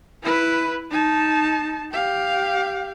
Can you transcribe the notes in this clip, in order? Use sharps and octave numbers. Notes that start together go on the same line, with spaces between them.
E4 B4
D#4 A5
G4 F5